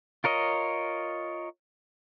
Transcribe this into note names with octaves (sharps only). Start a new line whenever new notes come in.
F4 A#4 C#5 D#5